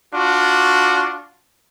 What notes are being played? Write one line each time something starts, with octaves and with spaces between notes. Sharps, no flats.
D4 F4 F#4